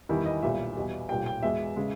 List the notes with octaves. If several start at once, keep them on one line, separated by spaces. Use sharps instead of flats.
E2 D#3 G3 E4
D#5
B1 A#2 G3 E5
E2 B2 G3
B1 A#2 G3 G5
G5
E2 B2 G#3 E5
C#3 G#3